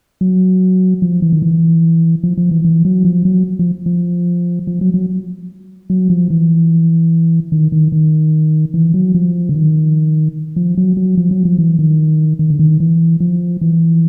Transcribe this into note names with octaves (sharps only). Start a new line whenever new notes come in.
F#3
F3
E3
D#3
E3
F3
F3
E3
E3
F#3
F3
F#3
F3
F3
F3
F#3
F#3
F#3
F3
E3
D#3
D#3
D#3
E3
F#3
F3
D3
D#3
F3
F#3
F#3
F3
F#3
F3
E3
D#3
D#3
D3
D#3
E3
F3
E3